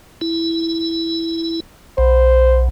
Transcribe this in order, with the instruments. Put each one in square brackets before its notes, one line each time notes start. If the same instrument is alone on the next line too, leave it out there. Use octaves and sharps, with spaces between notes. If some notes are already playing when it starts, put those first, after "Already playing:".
[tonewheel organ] E4
[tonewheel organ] B1 [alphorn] C5